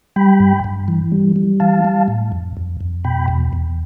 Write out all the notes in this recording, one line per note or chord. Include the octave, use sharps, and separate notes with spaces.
G3 G5 B5
G2
G2
E3
G3
G3
E3 F5 A5
G3
A2
F2
F2
F2
B2 G5 B5
E2
E2